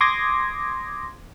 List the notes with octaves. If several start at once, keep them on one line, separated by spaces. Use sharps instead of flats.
C6 D6 D#6 G#6 A#6